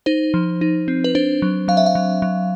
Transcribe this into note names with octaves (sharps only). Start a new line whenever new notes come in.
D#4 C5
F3
D#4
C4
B4
D4 C5
F#3
F#3 F5
E5
F5
F#3
F#3